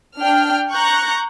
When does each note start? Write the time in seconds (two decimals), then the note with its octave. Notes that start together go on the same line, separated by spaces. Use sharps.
0.18 D4 G5 F6
0.70 A#5 C#6 F#6 G6